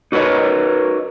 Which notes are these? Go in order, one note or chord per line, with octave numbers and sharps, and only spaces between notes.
D#4 F#4 A#4 B4 C#5 D#5